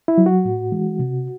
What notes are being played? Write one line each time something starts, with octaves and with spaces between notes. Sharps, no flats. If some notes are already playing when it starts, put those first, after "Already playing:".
E4
F#3
F#4
A2
E3 G#3
C3